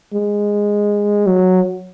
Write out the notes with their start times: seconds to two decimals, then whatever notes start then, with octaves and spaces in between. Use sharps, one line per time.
0.13 G#3
1.27 F#3